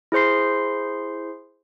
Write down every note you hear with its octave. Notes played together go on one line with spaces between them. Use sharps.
E4 G#4 C5 C6 C7